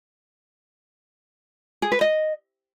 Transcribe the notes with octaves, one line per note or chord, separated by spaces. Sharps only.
G#4
B4
D#5